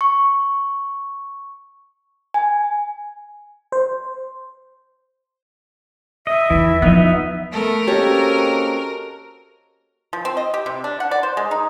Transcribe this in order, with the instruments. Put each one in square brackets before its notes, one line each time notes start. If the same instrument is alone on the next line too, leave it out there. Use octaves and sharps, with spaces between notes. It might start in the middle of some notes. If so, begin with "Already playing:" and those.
[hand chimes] C#6
G#5
[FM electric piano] C5
[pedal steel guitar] D#5 [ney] E5
[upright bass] E2 [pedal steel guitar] E3
[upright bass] F3 [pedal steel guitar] B3 D#4 D#5
[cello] A3 B3 [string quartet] A#4
[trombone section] A#3 C4 C#4 [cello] F#4 D#5 [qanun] G4 A4 C#5
[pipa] F3
C4
D#5
G4
C3
D4
F#5
D5
C5
G#3
D#4